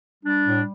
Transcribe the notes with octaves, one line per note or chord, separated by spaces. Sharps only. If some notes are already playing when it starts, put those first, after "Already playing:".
G3 D4
A2